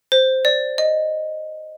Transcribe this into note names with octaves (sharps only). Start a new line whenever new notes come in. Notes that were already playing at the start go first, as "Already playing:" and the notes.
C5
D5
D#5